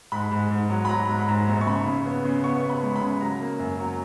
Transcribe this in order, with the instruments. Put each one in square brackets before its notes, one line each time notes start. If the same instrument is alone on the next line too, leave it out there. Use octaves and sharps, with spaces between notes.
[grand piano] G#2 B5
G#2
G#2
F#3
B5
F#3 A#5
G#2
B5
G#2 A#5
A#1
C#6
C#3 B5
C#3
B3
C#3
B3 C#6
B3
B5
G#3
B5
C#3
F#3 A#5
A#3
F#2
F#3